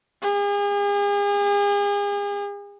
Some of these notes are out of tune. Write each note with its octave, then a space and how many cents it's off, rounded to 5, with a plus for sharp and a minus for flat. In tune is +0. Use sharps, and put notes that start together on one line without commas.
G#4 -40